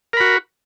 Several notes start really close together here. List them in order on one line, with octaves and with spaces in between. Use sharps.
A#4 B5 F#4